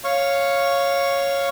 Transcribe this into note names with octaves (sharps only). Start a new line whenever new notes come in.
C#5 F5 C#6